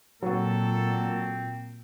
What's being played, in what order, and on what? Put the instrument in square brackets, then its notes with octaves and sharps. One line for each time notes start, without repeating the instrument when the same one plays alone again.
[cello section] A#2 [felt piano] F#3 F#4 [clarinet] C4 [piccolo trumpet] A4